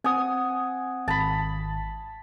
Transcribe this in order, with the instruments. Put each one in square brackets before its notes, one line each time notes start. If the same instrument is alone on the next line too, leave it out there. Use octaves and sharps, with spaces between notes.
[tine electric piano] C4 F#5 [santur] G#5 D#6
[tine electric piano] G#1 [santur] A5 B5